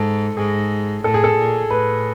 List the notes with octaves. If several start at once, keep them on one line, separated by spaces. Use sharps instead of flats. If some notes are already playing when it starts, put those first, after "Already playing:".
Already playing: G#2 A4
G#2 G#4
A2 A4
G#4
A4
A#2
A2 B4